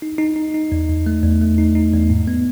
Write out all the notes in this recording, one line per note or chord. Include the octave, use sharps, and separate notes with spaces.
D#4
D#4
D#4
D#4
E2
E2
A3
E2
A3
D#4
D#4
E2
G#2
B3